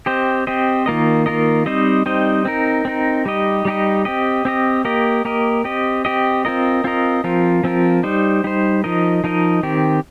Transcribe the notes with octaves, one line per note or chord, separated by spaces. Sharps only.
C4 G4 C5 D#5
C4 G4 C5 D#5
D#3 A#3 F4 A#4 D#5
D#3 A#3 F4 A#4 D#5
G3 C4 D#4 C5 D#5
G3 C4 D#4 C5 D#5
C4 D#4 A#4
C4 D#4 A#4
G3 D#4 G4 D#5
G3 D#4 G4 D#5
C4 G4 D#5
C4 G4 D#5
A#3 G4 A#4 D#5
A#3 G4 A#4 D#5
C4 G4 D#5
C4 G4 D#5
C4 F4 A#4 D#5
C4 F4 A#4 D#5
F3 C4 F4 A#4
F3 C4 F4 A#4
G3 D#4 C5
G3 D#4 C5
F3 D#4 A#4 D#5
F3 D#4 A#4 D#5
D#3 C4 G4